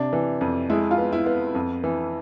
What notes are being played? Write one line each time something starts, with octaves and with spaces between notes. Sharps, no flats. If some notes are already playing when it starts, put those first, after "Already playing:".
Already playing: C3 D4
E3
F2
G#3 E4
F4
B3
E4
B3
F2
E3